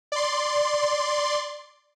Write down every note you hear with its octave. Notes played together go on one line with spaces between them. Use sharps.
D5 C6